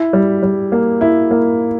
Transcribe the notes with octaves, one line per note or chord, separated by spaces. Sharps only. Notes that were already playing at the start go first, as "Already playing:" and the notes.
Already playing: E4
G3
G3
A#3
E4
A#3